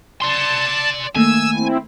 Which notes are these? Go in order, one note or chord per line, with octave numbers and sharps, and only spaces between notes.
D5 A5 C6
D#3 A3 A#3 G#5 E6
C4 E4